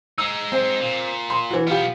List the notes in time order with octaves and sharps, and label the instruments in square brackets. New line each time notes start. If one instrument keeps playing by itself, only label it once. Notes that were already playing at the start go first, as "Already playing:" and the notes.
[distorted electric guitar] G#3 D#4 [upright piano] E6
[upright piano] C4
[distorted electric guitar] A#2
[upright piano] C6
E3 F#4
[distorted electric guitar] B1 B3 [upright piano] F4 G4